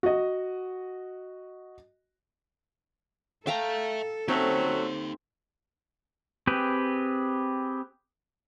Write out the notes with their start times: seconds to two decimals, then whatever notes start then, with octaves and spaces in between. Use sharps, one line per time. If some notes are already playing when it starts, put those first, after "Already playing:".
0.03 F#4 D#5
3.47 A4 E5 F5 G5 A5 A#5
4.28 F#3 A3 C4 C#4 D#4 G4
6.47 C4 G4 G#4 B4